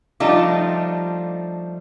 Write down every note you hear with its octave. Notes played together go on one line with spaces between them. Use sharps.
F3 G3 A3 D4 D#4 F4